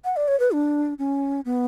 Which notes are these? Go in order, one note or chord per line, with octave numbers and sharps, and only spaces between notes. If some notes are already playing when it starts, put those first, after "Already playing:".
F#5
D5
C#5
B4
D4
C#4
B3